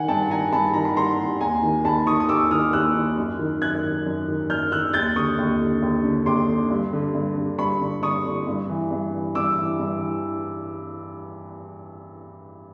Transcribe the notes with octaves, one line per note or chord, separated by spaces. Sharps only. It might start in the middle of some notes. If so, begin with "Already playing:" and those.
Already playing: D#3 F#5 G#5
G2 G5 A5
D#3 G#5 A#5
G2 A5 B5
D#3 A#5
B5
G2 A#5 C6
D#3
D#2 G#5 A#5
D#3
D#2 A5 B5
D#3 C#6 D#6
D#6
D#2 D6 E6
D#3 D#6 F6
D#2 E6 F#6
D#3
F#2
D#3
F#2 F#6 G#6
D#3
F#2
D#3
F#2 F6 G6
D#3 E6 F#6
D#2 G6 A6
D3 C#6 D#6
D#2
D3
D#2
D3
D#2 C6 D6
D3
G2
D3
G2
D3
G2 B5 C#6
D3
G2 C#6 D#6
D3
G2
E3
G2
E3
G2 D6 E6
E3
G2
E3